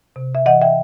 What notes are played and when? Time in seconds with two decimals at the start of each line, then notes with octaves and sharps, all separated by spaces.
0.16 C3
0.35 E5
0.46 E3 D#5 F#5
0.61 E5 G5